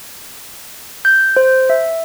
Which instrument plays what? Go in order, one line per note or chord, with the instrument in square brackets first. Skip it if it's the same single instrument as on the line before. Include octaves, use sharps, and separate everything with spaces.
[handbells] G6
C5
E5